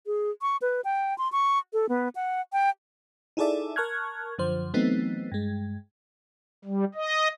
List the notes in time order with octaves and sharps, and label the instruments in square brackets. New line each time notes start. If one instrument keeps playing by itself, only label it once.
[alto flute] G#4
C#6
B4
G5
C6
C#6
A4
B3
F#5
G5
[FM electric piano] D#4 E4 G#4 A4 D5 E5
A#4 A5 C#6 F6 F#6 G#6
F#2 D3 F3 C5
E3 F#3 A3 B3 C4 D#4
G2 G#3
[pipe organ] G3
D#5